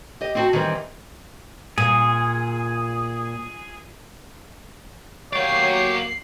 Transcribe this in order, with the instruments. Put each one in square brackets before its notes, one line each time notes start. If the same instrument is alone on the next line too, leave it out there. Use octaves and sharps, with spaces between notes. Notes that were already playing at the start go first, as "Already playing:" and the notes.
[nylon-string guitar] G4 D#5
C4 F#4 A5
D#3 E3 G3 C4
[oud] A#2 [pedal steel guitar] G#4
[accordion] F#3 A#3 [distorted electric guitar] F#4 D5 [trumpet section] G4 C#5 [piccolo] C7